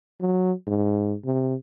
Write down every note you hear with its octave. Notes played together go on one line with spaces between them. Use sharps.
F#3
G#2
C3